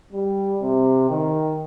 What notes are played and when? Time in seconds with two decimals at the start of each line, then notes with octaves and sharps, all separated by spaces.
0.12 G3
0.61 C3
1.10 D#3